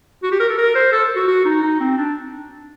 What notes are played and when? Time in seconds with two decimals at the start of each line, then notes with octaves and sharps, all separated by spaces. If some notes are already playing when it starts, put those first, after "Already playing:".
0.23 F#4
0.32 G4
0.40 A#4
0.49 A4
0.58 A#4
0.75 C5
0.92 A4
1.16 F#4
1.27 F#4
1.45 D#4
1.63 D#4
1.80 C4
1.97 D4